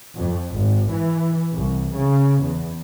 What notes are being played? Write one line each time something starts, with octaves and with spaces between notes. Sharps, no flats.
F2
G#1
E3
C2
C#3
E2